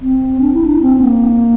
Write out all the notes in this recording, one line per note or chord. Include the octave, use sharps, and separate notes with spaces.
C4
D4
E4
D4
C4
A#3